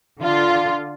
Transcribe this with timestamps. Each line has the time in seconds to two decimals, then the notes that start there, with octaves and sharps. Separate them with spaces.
0.23 D3 F4